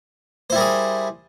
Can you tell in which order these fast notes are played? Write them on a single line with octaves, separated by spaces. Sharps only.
C5 E4 G3 A#4 G#4